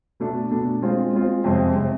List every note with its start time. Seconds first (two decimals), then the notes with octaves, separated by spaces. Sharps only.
0.20 B2 A3 D4
0.51 B2 A3 D4
0.82 G#3 C4 F4
1.13 G#3 C4 F4
1.44 F2 C3 G#3 C4
1.76 C3 G#3 C4